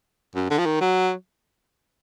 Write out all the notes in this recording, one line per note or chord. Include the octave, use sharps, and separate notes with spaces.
F#2
D3
F3
D#3
F#3